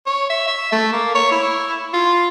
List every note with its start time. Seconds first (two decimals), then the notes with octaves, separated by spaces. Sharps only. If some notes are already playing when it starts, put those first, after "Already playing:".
0.06 C#5
0.30 E5
0.47 E5
0.72 A3
0.92 A#3
1.15 C#5
1.31 E4
1.93 F4